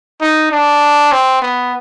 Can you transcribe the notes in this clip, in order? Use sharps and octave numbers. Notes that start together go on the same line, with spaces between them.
D#4
D4
C4
B3